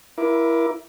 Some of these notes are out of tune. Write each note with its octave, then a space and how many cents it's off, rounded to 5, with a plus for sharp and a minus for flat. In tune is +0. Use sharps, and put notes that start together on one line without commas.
E4 +15 A#4 +30 D6 +0